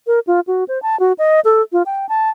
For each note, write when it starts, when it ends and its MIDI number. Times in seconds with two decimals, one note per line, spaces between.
0.07 0.20 70
0.27 0.40 65
0.47 0.64 66
0.68 0.81 72
0.82 0.98 81
1.00 1.13 66
1.19 1.40 75
1.45 1.62 69
1.73 1.83 65
1.86 2.08 79
2.09 2.30 81